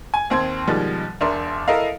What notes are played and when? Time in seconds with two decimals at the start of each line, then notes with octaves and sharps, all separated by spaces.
0.14 G#5
0.30 D#2 C4 C6 G#6
0.67 B2 D#3 F3 G3 G#3
1.21 E1 D4 A#4 E5 C6
1.68 E4 A4 A#4 D#5 F5